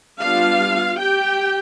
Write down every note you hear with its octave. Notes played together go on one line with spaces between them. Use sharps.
G3 B3 D4 F4 F5
G4 G5